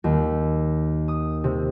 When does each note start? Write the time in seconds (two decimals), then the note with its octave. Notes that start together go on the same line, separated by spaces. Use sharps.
0.04 D#2
1.08 D#6
1.44 C3